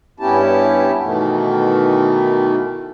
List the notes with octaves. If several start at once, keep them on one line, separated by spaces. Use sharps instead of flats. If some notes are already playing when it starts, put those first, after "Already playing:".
G2 B3 C#4 E4 G4 A5
B2 D#3 E3 A3 B3